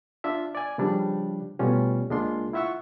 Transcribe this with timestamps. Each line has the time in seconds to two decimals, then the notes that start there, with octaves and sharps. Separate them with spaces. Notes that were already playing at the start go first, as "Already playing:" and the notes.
0.24 D4 F4 E5
0.55 D5 G#5
0.78 C#3 F3 G3 D4
1.59 B2 G3 A3 C#4 F4
2.10 C#2 G#3 A#3 D4 F4 C6
2.53 E4 F4 E5 F#5 C#6 E6